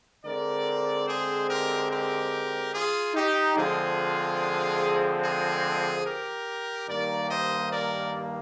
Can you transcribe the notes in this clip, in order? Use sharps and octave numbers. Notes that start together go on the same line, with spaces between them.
D3 G#3 C4 A#4 D5
G#4 C5
G4 A#4
G4 A#4
F4 G#4
D#4 G4
D3 F3 G#3 C4 F4 G#4
F4 G#4
G4 A#4
G2 D#3 A#3 A#4 D5
C5 D#5
A#4 D5